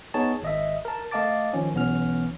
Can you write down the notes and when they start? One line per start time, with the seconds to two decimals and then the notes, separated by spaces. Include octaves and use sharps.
0.14 B3 D#4 G#4 C#5 A5
0.42 G#1 D#5 E5
0.85 A#4 A5
1.11 A3 D#5 F5 A5 D6 A6
1.53 D#3 F3 C#4
1.74 B1 E3 B3 C#4 F6